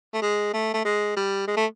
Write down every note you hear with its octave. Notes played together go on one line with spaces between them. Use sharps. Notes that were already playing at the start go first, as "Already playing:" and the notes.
A3
G#3
A3
A3
G#3
G3
G#3
A3